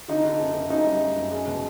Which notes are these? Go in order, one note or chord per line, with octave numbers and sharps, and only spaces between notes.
D3 D#4
D3
F#1
F#1
F#2 D#4
G3
G3
F#2
G#3
B2